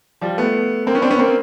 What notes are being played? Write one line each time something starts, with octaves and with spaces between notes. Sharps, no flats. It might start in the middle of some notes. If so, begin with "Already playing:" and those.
F3 G3
A3 B3
A#3 C4
B3 C#4
C4 D4
B3 C#4
A#3 C4